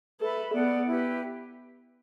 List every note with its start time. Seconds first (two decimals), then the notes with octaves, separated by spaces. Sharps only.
0.20 A4 B4 E5 B5
0.53 B3 A4 D5 F#5
0.87 E4 G4 B4